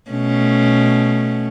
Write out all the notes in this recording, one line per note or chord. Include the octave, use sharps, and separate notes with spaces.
B2 A3 C#4